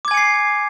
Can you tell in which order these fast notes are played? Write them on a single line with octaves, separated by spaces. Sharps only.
D6 G#6 G#5 C#7 C7